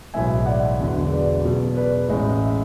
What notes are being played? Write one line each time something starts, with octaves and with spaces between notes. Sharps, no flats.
B1 A2 E3 G#3 E5 G#5
D5 F#5
E1 E2 D3 F#3
B4 D5
E2 B2 F#3
B4 D5
A1 A2 G#3
E5